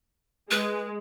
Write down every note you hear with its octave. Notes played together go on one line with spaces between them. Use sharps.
G#3 B4